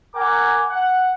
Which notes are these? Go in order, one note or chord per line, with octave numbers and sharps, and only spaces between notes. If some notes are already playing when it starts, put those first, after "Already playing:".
A#4 F#5 G#5 A#5 D6
F#5